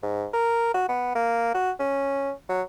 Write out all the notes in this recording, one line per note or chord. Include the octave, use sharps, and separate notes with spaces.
G#2
A#4
F#4
B3
A#3
F#4
C#4
F#3